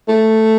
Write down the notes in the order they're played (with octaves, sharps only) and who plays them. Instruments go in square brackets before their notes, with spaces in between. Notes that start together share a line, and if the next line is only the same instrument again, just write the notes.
[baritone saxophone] A3